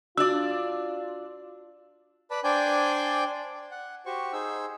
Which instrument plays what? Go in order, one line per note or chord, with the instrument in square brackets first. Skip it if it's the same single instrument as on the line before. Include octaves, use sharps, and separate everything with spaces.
[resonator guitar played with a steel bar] D4 D5 [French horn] F4 [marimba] F#4 [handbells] D6 E6
[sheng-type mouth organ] B4 D5 A5 B5
D4 C5 D5 G5 G#5 G6
F#5
F#4 G4 C5 C#6
D#4 G#4 C5 E6